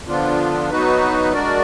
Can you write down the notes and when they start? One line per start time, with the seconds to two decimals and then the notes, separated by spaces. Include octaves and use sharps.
0.08 D3 F3 B3 D4 F4
0.70 F#3 B3 D#4 F#4 B4
1.33 G#3 D4 F#4 A#4 D5